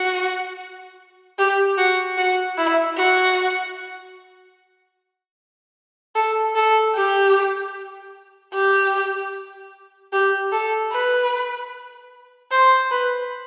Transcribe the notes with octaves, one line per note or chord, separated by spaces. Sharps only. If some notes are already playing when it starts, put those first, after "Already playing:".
Already playing: F#4
G4
F#4
F#4
E4
F#4
A4
A4
G4
G4
G4
A4
B4
C5
B4